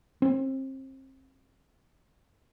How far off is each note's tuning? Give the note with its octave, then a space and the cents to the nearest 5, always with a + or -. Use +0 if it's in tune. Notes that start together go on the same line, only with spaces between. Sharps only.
C4 +30